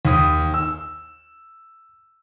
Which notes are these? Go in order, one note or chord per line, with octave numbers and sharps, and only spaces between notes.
D#2 D#6
E6